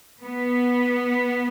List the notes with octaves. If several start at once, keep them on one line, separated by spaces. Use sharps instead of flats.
B3